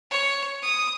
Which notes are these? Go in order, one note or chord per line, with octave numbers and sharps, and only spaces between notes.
C#5
D#6